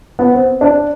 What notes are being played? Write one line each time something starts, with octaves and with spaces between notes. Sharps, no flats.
B3
C4
D4